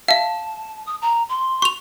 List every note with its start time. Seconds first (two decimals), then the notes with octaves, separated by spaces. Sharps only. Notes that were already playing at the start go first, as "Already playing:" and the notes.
0.08 E5 F5 A5
0.86 D#6
1.02 A#5
1.29 C6
1.62 C#6 F7